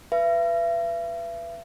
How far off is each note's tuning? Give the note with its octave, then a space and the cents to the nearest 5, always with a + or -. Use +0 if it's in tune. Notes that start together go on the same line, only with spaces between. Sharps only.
B4 +0 E5 +40